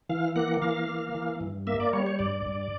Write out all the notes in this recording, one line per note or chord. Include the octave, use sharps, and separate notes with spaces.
E3 F5
A#3 F#5
E3 F5
A#3
E3
G2
A#3 E5
D5
G3 C#5
C#5
G2 D5
G2